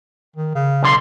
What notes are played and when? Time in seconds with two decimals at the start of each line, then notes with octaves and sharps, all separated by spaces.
0.36 D#3
0.55 C#3
0.83 B1 D3 C6